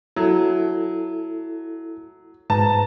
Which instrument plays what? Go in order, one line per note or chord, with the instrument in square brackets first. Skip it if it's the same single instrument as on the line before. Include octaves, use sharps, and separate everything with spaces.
[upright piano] F#3 [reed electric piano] E4 A4
[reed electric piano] G#2 B4 A#5 [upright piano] A5